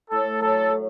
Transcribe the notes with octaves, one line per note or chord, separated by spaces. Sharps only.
A2 A4
F#3 A4
A2